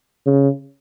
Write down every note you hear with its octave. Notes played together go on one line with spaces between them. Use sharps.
C#3